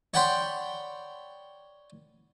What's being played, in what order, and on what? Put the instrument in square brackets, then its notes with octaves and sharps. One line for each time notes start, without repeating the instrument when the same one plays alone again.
[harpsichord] C#5 D5 F#5 G5 B5 C6